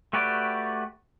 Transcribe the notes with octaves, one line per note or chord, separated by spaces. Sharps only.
A3 F#4 G4 B4 D5